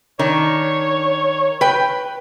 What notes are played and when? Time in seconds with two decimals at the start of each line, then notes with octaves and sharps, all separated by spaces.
0.19 D#3 D4 C#5
1.61 B4 G5